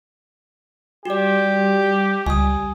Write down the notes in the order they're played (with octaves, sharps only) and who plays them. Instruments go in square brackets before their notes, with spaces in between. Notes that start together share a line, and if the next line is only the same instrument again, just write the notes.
[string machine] G3 [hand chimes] F#4 D5 [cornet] G4
[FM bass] C#2 [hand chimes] G#5 D#6